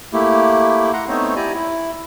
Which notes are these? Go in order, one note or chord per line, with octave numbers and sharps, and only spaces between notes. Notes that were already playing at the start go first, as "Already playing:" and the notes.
A3 A#3 E4 G4
F#5 A#5 C6
A3 B3 C4 D#4 C5 C#5
E4 G4 D5 G#5 A#5
E4